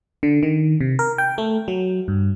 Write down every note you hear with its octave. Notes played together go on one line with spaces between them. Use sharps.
D3
D#3
C3
A#4
G5
A3
F#3
G2